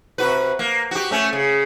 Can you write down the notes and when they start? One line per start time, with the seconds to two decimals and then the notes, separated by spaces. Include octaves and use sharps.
0.18 C3 F#4 B4
0.59 A#3
0.91 F#4 G4
1.11 A3 C#4
1.33 C#3